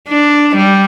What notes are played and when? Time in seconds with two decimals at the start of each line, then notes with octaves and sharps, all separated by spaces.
0.09 D4
0.57 G3